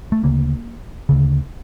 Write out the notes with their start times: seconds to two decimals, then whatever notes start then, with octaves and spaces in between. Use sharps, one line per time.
0.12 A3
0.23 D2 C#3 A#3
1.09 D2 C#3